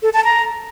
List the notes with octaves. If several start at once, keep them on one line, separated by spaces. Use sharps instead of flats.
A4
A5
A#5